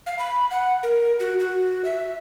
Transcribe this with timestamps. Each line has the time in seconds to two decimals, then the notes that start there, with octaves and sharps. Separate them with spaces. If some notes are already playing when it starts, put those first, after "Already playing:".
0.06 F5
0.19 B5
0.51 F#5
0.83 A#4
1.20 F#4
1.40 F#4
1.85 E5